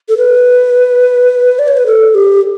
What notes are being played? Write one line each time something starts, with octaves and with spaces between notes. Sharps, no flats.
A4
B4
D5
C#5
B4
A4
G4